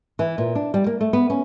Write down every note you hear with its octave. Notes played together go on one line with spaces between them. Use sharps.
E3
A#2
D4
G3
A#3
A3
B3
C#4